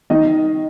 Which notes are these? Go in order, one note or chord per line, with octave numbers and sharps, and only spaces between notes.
D#3 D#5